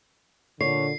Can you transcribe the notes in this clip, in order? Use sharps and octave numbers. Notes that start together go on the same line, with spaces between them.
A#2 D3 C#5 C7